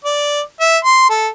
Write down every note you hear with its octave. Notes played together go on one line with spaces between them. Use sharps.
D5
E5
C6
A4